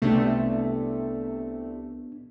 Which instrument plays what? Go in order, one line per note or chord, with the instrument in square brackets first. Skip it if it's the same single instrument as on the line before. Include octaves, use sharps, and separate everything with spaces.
[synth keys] C2 C3 A3 [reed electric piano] B3 D4